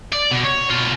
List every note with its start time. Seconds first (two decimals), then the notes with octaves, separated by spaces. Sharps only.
0.13 D5
0.31 B2
0.45 C#5
0.70 B2 F4